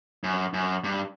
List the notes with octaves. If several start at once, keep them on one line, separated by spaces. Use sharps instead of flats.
F#2
F#2
G2